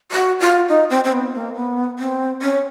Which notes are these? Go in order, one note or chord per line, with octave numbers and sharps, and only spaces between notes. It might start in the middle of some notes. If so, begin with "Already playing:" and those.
F#4
F4
D#4
C4
C4
B3
A#3
B3
C4
C#4